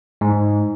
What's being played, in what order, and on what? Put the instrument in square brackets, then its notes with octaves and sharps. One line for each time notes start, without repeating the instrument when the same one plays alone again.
[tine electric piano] G#2